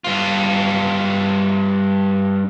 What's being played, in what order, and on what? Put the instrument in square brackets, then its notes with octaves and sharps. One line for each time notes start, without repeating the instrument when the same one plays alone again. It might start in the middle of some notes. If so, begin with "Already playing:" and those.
[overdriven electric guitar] G2 F4